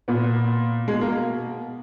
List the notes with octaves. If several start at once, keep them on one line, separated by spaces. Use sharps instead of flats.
A#2 B3
B2 G#3
A#3